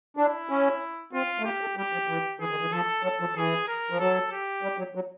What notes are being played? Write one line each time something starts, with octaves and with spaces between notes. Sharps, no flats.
D4 E4
C#4
C4 F4
A3
A#3 G4
A3
G3 G4
F3
E3
E3 G#4
D#3
E3
F3 A4
F#3 A4
F3
E3 G#4
A#4
F3
F#3 A4
G4
G3
F#3
F#3